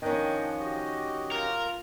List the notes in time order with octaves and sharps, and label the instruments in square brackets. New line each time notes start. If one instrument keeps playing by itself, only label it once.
[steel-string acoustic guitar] D#3 C#4 [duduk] F3 [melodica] D4 D#5 G5
[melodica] F#4 G4 D#5
[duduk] F4 [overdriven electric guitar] A#4